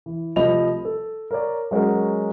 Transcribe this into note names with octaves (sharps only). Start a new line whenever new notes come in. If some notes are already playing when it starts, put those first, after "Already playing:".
E3
C2 F3 A3 D#5 B5 F7
A4
A#4 C#5 D5
F#3 G#3 C#4 F#4 A#4